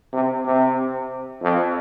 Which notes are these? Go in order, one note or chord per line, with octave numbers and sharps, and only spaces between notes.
C3
C3
F2